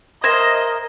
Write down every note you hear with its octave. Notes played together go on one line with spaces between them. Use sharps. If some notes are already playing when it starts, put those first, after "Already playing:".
A#4 C5 D#5 E5 G#6 A#6